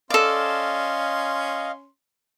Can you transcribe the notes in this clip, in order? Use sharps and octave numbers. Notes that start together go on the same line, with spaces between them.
C#4 A4 D5 D#5 F5 C6